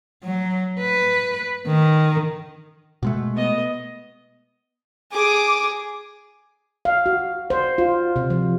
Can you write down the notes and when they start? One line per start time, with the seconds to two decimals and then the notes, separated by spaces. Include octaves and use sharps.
0.23 F#3
0.80 B4
1.67 D#3
3.03 B2 G#3 A3
3.35 B3 D#5
5.12 G#4 D6
6.85 F5
7.06 F#4
7.50 C5
7.78 F4
8.16 C3
8.30 F3